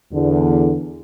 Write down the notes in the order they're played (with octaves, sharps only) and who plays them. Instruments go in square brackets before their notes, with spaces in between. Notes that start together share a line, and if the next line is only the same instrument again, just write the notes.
[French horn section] E2 D3